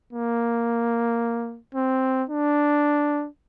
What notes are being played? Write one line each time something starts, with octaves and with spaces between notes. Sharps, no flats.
A#3
C4
D4